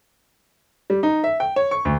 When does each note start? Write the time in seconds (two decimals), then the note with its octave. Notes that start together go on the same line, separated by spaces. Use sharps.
0.90 G3
1.03 D#4
1.24 E5
1.40 G5
1.56 C#5
1.71 C#6
1.85 D2